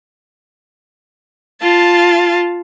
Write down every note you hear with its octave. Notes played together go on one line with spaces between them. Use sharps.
F4 F5 A5